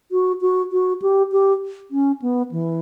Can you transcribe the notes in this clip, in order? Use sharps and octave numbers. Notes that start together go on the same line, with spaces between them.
F#4
F#4
F#4
G4
G4
C#4
B3
E3